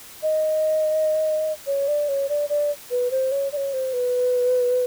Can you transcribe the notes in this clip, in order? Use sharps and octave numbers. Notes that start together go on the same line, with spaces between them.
D#5
C#5
D5
C#5
D5
D5
B4
C5
C#5
D5
C#5
C5
B4